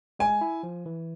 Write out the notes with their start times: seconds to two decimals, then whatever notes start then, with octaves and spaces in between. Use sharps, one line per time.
0.19 G#3 G#5
0.41 E4
0.63 F3
0.86 E3